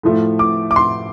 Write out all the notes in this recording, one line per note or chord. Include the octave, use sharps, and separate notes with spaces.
A2 F3 A3
D6
D6
C6